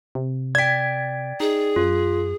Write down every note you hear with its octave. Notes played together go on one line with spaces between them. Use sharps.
C3
D5 G5 G#6 B6
D#4 G#4
F#2 F4